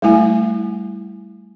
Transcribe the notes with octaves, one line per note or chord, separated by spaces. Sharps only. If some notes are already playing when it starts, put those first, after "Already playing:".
G3 A3 E4 G#5